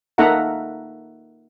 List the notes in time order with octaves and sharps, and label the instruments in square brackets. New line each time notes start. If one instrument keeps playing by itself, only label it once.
[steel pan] A#3 D#4 A4 E5 F#5 A#5